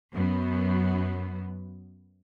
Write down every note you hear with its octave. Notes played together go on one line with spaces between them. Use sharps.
F#2 B3